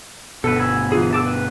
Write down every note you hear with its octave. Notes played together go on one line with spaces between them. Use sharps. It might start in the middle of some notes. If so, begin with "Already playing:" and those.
G1 B2 A4 B4
G#5 B5 E6
E3 F4 G#4
A5 D6 E6
B4